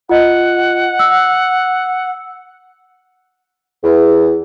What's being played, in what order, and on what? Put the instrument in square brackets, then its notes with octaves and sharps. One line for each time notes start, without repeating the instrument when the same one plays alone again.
[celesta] F4 D#5 [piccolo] F#5
[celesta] E6
[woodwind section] E2